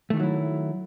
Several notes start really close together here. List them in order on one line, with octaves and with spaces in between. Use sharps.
A3 D#3 E3 F#3 E4